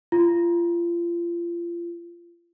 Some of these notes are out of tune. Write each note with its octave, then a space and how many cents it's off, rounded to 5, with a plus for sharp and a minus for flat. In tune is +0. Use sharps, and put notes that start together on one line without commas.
F4 -30